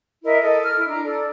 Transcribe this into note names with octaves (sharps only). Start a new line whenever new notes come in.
E4 A#4 D#5 E5
A4 D#5
F6
E4
D4 A#5
A4 D5